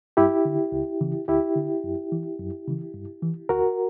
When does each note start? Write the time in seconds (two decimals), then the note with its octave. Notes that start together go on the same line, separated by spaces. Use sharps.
0.17 G2 E4 G4
0.45 D3
0.72 C#2
1.01 C#3 E3
1.28 D2 E4 G4
1.56 D3
1.84 F#2
2.12 E3
2.39 F#2
2.67 C#3 E3
2.94 G2
3.23 E3
3.49 D2 F#4 A#4